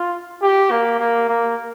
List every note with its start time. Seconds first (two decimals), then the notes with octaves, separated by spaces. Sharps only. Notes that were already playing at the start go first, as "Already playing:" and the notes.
Already playing: F4
0.42 G4
0.71 A#3
1.00 A#3
1.29 A#3